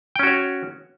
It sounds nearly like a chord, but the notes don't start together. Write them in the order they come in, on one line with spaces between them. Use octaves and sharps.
G5 C#4 F#4 C#5